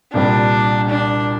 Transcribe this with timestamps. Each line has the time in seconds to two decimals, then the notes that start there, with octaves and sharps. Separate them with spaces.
0.13 C2 A#2 G3 C4 D4
0.89 D4